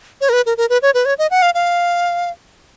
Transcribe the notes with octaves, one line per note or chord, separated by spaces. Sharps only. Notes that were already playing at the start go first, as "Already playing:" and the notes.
C#5
A#4
B4
A#4
A#4
B4
C#5
B4
C#5
D#5
F#5
F5
F5